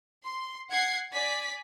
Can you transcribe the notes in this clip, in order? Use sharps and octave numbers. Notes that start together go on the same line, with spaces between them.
C6
F#5 G#6 C7
D5 G#5 B6